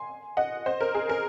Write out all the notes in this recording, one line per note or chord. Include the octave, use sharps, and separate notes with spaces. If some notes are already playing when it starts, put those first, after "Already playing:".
Already playing: G#5 C6
D#5 F#5
C5 D#5
A#4
G#4
A#4